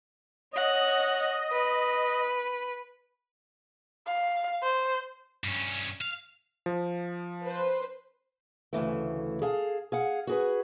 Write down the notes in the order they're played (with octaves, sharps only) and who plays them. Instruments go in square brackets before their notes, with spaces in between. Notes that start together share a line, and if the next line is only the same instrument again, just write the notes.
[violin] C#5 F#5 [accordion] D#5
[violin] B4
[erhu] F5
C5
[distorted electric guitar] G2 C#4
F5
[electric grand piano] F3
[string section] B4 C5
[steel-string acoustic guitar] D2 C#3 E3 A3
G#4 A4 F5
G#4 F5 F#5
F#4 G#4 B4